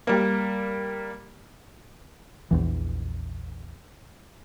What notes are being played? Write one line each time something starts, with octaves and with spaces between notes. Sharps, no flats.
G3 A#3
A#1 E2 E3